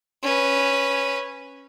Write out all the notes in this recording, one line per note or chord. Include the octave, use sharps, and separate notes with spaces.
C#4 B4